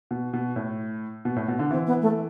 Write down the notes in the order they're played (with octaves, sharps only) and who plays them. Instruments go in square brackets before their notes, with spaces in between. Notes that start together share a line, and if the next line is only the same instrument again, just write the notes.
[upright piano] B2
B2
A2
B2
A2
B2
D3
[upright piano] E3 [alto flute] C4
[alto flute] B3
A3